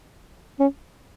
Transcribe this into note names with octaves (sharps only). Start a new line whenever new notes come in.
C#4